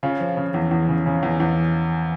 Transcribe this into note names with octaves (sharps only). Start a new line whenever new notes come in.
C#3 F4
F3
C#3
E2
E2
C#3
C#3
E2
E2